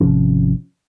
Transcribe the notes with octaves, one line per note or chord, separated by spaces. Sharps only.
G#1 C3 F3 C#4